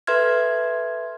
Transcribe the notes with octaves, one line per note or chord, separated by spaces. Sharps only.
A4 B4 E5 C6 F6 G#6